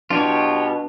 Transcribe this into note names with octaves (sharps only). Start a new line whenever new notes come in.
B2 D4 F4 G4 C#5